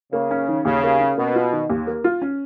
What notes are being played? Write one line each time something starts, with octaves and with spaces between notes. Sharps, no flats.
C#3 A#3
C#4
D#3
D#2 C#3
A#3
C#4
B2 A#3
F4
D#3
D#2
A#3
F4
C#4